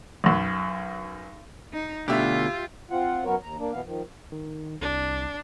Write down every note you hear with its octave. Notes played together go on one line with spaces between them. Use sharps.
B1 F#2
D#4
D2 B2 D3 F4 G4 E5
C4 F4 F#5
F#2 F#3 B3 F#4 A#4 C#5
D#2 A#5
A#3 D4
F#2 B2 E3 B3 F5
D#3 F3
D#3
C2 D4